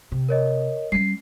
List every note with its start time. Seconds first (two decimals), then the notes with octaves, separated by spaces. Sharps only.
0.12 C3
0.29 A#4 C#5 D#5
0.92 G3 C#4 C7